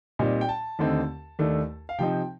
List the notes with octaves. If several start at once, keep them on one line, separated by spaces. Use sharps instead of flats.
A#2 G3 C4 D#4
G5
A5
D#2 D3 A3 C4 D#4
D#2 D#3 A3 D4
F5
C3 F3 C4 D#4 G5